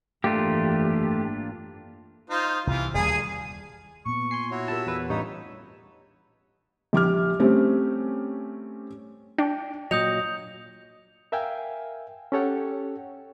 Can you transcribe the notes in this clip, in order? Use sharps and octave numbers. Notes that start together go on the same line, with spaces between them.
G#1 F#2 E3 A3 A#3 D4 F4 G4
D#4 F4 C5
C2 C3 E3 F4
D#1 D2 G3 G#4 G#5
A#2 B3 C#6
G#5 C6 C7
E4 F#4 C#5
F4 G4 A#4 E5 A5 B5 E6
E2 B4
A1 G2 D#4 C#5 F#5 B5 C#6
A#1 G4 D6 F6
G3 A3 C4 C#4 G4
D4 G5
A#2 F#3 D#5 D#6 G6 C#7 F7
A#4 E5 F5 G5 G#5
C#4 G4 A4 C#5 F#5 G5